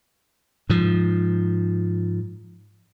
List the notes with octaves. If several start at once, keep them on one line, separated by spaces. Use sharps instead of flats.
G#2 F3